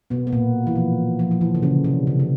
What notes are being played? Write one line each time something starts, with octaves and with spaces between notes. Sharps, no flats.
B2 B3
B3
A#2 A#3
E3
F3
F3
F3
E3
D3
C#3
C3
C#3
C#3